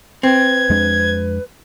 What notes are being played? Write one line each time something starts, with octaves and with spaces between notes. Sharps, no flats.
C4 B4 G#6
F2 G#3 D4